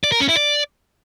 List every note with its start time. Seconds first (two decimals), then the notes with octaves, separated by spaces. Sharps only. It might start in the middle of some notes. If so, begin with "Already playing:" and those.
0.04 D5
0.12 A#4
0.20 C#4
0.29 E4
0.37 D5